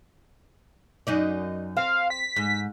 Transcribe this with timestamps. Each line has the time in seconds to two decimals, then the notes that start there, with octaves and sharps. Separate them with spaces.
1.07 F#2 D#4 D5
1.77 C4 F5
2.10 B6
2.36 G#2